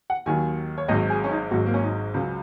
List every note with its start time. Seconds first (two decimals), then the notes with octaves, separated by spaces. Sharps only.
0.10 F#5
0.26 D#2 D#3 F#3 G#5
0.78 C#5
0.88 G#1 G#2 F#3 D#5
1.10 G#4
1.24 C#4
1.31 D#4
1.51 G#1 G#2 F#3 F#4
1.66 A#3
1.74 C#4
1.83 D#4
2.14 C#2 C#3 F#3